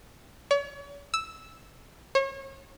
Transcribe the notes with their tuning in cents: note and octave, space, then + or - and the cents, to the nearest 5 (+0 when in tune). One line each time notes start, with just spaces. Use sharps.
C#5 +40
E6 -5
C#5 -35